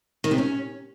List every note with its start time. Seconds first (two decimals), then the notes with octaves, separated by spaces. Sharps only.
0.24 D#3
0.31 C3
0.38 C#4